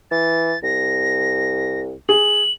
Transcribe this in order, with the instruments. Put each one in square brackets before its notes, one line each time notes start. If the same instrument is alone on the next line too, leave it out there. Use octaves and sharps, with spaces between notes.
[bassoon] E3 [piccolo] A6
[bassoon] C2 [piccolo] A#6
[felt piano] G#4 [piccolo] F#7